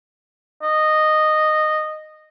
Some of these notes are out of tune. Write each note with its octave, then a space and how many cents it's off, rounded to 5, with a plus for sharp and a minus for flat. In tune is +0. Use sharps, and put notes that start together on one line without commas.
D#5 -10